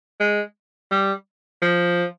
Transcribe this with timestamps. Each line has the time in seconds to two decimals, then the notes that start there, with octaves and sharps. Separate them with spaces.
0.20 G#3
0.91 G3
1.62 F3